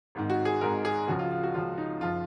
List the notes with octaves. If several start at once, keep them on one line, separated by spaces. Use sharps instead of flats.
G#1 G#2 D#3
F#4
G#4
G#1 G#2 D#3 A#4
G#4
C#2 C#3 F3 F#4
F4
F4
F#4
C#2 C#3 F3 F4
D#4
F#1 F3 F4